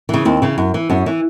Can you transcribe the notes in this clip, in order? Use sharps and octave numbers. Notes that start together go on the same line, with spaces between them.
C#3 E3
D#2 C4
C#3 E3
F#2
E3
F#2 C#4
E3